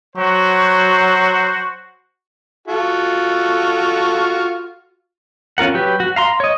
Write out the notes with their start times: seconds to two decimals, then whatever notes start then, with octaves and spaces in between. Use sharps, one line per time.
0.16 F#3 F#4 C5
2.68 F4 F#4 A4
5.58 C#4 F4 A#4 F#5
5.74 F#3 G4 B4
6.00 F#4
6.16 F5 A#5 C6
6.40 C#5 D#5